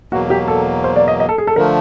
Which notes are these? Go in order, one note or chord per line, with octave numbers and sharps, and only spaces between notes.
E2 B2 F#3 A#3 F#4
G4
A4
C5
D5
D#5
D#5
A4
G#4
A4
D3 F3 A3 A#4